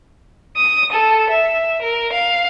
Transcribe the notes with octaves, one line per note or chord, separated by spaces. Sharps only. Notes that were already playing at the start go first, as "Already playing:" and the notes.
D#6
A4
E5
A#4
F5